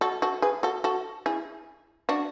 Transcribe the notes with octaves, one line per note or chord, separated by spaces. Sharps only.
F#4 A4
F#4 A4
G#4 B4
F#4 A4
F#4 A4
E4 G#4
D4 F#4